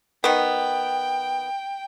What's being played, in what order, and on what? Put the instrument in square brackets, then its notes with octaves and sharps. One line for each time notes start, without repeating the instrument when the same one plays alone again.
[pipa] D#3 B3 [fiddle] G5